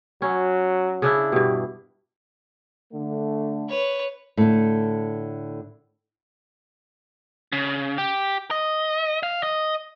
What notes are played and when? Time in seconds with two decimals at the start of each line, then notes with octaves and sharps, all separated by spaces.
0.22 F#3 C#4
1.02 C#3 D4 E4
1.32 G2 B2 G4
2.93 D3 A3
3.69 B4 C#5
4.37 A2 D3
7.52 C#3
7.98 G4
8.51 D#5
9.23 F5
9.43 D#5